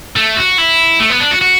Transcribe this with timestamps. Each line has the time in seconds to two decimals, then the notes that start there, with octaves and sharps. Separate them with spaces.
0.16 A3
0.37 F#4
0.58 E4
1.00 A3
1.10 B3
1.20 D4
1.31 F#4
1.42 F#4